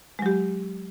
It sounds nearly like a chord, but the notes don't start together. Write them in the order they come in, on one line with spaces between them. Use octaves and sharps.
G#3 F#3 G4